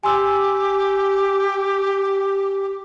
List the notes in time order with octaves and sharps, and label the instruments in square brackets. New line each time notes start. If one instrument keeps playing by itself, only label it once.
[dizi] G4 [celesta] G#5 C6 E6